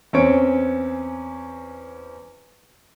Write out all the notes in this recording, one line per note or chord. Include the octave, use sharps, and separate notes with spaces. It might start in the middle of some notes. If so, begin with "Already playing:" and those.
E2 C4 C#4 C#5 C#6 D7